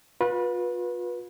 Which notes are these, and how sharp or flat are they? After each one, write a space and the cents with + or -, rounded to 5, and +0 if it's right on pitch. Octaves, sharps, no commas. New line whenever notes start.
F4 +40 B4 -20